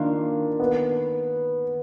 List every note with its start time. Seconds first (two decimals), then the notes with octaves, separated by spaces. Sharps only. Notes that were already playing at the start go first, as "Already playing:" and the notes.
Already playing: D#3 A#3 D4 F4
0.60 B3